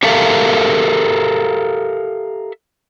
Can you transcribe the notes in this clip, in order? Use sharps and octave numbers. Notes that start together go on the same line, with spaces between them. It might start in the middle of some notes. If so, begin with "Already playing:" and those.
G4 A4 A#4 E5 F5